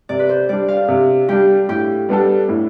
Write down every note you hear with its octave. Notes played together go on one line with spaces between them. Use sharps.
C3 D5
B4
C5
G3 D4 D5
F5
C3
G3 D4 G4
A2 G4
G3 B3 D4 A4
A2